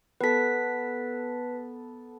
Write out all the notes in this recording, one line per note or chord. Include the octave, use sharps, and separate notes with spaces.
B3 A4 B4 B6